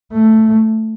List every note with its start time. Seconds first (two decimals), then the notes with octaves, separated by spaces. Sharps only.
0.13 A3